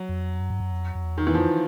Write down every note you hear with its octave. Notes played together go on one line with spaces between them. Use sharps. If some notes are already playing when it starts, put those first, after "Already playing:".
Already playing: F#3
F2
F#2
G2
F#2
F2
F2
E2
D#3
E3
F2 F3